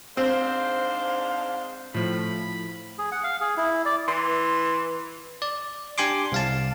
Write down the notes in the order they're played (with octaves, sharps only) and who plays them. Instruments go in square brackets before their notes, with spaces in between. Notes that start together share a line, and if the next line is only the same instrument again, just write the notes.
[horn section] G#2 D4 F5 [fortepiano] C4 [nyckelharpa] C5
[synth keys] A2 F3 [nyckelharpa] B5
[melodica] G#4
F#5
F5
G#4
E4
D5
[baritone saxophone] E3 [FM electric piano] C6
[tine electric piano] D5
D4 G4 G#5 C6 D6
C2 F5 A5